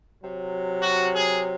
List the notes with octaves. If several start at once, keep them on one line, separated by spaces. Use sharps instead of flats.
C3 F#3
F#4
G#4